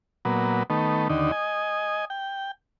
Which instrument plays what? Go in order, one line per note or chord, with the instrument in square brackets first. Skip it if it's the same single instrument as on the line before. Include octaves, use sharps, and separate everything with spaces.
[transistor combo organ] A#2 F#3 B3
D#3 A3 B3
D#2 D3 D#4
D#5 G#5
G5